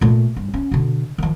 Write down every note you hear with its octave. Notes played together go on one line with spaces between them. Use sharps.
A#2 A3
G2
C#4
B2 D3
D#3 F3